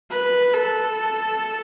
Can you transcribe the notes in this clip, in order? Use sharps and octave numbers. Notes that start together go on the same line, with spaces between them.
B4
A4